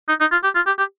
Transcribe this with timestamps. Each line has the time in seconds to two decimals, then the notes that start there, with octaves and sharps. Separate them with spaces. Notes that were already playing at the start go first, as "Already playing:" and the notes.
0.09 D#4
0.21 D#4
0.32 F4
0.44 G4
0.55 F4
0.67 G4
0.78 G4